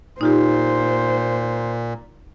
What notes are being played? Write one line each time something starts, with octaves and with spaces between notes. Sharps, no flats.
A#2 D#4 F4 G4 C5